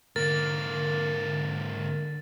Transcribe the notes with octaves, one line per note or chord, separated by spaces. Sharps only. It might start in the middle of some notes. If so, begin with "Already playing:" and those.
G#2 D3 A#3 A#4 A6